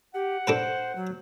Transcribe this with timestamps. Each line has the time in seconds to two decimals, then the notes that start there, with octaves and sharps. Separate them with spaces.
0.14 G4 F#5
0.47 D4 A4 B4 C5
0.95 F#3